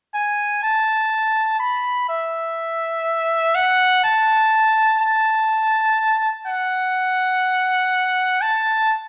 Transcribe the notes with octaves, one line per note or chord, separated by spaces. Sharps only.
G#5
A5
B5
E5
F#5
A5
A5
F#5
A5